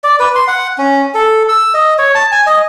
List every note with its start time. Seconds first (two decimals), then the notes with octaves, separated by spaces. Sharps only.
0.04 D5
0.20 B4
0.35 C6
0.48 F#5
0.78 C#4
1.14 A4
1.49 E6
1.74 D#5
1.99 C#5
2.15 A5
2.32 G#5
2.46 D#5